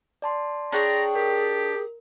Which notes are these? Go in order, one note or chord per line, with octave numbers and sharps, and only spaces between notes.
D5 A5 C6
D4 G#4 C#5 G5 A#5
G4 A#4